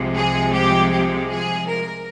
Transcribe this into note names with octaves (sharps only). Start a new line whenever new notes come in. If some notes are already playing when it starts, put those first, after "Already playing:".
Already playing: C2 C3 F3 G#3
G#4
G4
G4
G#4
A#4